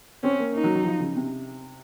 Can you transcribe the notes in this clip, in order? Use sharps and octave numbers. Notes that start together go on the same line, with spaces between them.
C4 C#4
A#3
A#3 D#4
F#3
F#3
F3
C#3
C3